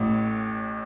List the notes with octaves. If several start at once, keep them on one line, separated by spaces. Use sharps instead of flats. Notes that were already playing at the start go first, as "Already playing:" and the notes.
Already playing: A1 A2